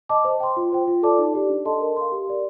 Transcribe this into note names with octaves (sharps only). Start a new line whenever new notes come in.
D#5 A5 D6
C5
G5 C6
F4
C5 G5
F4
A4 D5 A5 D6
D#4
G4 D5
D4
A4 D#5 A5 C6
A#4
F5 C6
G4
A#4 D5